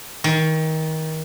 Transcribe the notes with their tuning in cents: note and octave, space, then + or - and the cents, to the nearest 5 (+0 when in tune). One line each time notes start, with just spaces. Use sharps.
D#3 +25